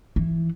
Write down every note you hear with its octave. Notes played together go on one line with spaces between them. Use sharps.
E3